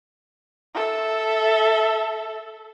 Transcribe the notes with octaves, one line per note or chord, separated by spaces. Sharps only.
A4 E5